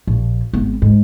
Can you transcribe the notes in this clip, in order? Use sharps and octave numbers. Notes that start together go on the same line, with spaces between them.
A#1
G#1 B3
G#2